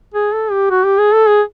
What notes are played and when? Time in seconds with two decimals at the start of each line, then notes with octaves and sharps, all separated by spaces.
0.14 G#4
0.33 A4
0.51 G4
0.70 F#4
0.84 G4
0.98 G#4
1.12 A4
1.27 G#4